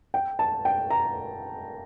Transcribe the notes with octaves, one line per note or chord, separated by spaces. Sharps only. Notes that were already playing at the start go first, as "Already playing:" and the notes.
G5
A5
G5
A#5